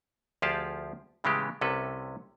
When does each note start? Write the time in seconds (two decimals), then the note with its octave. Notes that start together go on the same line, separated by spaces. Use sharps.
0.42 D2 F3 F4 G4 G#4 A5
1.24 A2 C#3 E3 G#3 B3 G4
1.61 C2 C3 C#4 A4 B4